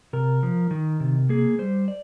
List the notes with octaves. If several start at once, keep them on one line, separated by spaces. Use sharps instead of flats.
C3 A#4
F3
D#3
C3
A#3 G#4
G3 C5
D5